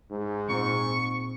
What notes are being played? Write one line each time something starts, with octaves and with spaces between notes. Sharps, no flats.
G#2
A#2 C4 C#6